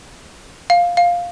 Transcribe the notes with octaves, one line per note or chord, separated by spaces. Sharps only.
F5
F5